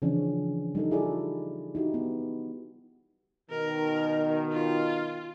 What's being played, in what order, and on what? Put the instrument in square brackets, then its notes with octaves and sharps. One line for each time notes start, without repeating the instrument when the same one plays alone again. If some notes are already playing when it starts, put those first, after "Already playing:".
[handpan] C#3 E3 F3 C#4 D4
G3 D#4 A4
E4 F4 G#4 A4 D5
D#4 E4 F#4 G4
B3
[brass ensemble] B2 D#3 [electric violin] A#4
[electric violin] F4